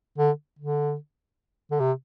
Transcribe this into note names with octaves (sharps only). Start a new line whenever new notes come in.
D3
D3
D3
C3